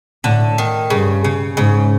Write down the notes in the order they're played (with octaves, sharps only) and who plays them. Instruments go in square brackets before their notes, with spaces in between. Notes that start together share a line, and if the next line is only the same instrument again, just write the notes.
[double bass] A2 [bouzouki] D3
[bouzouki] D#3
[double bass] G2 [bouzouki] C#3
[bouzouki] C#3
[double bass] G#2 [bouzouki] C#3